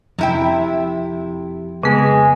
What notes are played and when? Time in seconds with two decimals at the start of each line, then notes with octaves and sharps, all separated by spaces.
0.18 F2 C3 E4 G5
1.83 C#3 G#3 B3 G#5